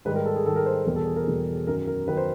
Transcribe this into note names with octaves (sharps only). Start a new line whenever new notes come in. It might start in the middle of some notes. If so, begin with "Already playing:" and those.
G#2 D#3 G3 B4
A#4
A4
G#4
G#2 D#3 G3 A4
A#4
C5
E2 B2 G3 A#4
A4
G#4
A#4
E2 B2 G3
F#2 D#3 F#3 A#4
A#4
D#3 F#3 B4
C5